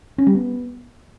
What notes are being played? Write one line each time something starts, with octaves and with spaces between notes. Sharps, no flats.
C#4
G3
B3